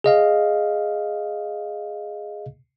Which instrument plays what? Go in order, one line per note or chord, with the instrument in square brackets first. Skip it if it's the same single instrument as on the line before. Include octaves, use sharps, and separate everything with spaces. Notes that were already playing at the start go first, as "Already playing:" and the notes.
[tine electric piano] G#4 D#5 F5